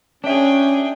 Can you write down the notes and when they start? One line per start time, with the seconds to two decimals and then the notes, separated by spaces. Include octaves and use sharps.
0.24 C#4 D4 G#4 E5 G5